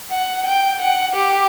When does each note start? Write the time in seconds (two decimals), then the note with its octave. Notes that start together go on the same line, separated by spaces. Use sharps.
0.11 F#5
0.46 G5
0.81 F#5
1.15 G4